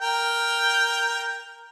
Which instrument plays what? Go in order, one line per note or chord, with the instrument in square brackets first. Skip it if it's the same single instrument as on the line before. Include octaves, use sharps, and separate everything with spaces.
[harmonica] A#4 G5